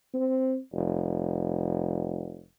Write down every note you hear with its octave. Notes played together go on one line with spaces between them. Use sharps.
C4
F1